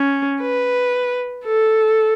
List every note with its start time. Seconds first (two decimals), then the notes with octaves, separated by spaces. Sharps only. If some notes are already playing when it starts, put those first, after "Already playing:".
Already playing: C#4
0.42 B4
1.46 A4